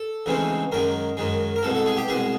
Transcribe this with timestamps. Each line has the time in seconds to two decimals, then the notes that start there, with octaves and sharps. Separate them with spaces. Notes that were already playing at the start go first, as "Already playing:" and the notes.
Already playing: A4
0.26 D2 C#3 E3 G#3 C4
0.72 F#2 D#3 G#3 A#4
1.17 F#2 D#3 G#3
1.56 A#4
1.63 C2 B2 G#3 A4
1.75 A4
1.86 G#4
1.97 G4
2.08 C2 B2 G#3 G#4